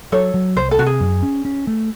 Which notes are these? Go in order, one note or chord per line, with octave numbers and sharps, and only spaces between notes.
F#3 A4 C#5
F#3
C2 C5
A4
C3 F#4
G#4
F#2
C#4
C#4
A3